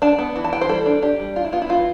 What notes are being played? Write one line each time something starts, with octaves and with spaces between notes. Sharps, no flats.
D4 A5
B3
E3
A5
E3 G5
C5
G3 A4
D4
D4 G4
G3
D4 F4
E4
B3 F4
E4
E3 F4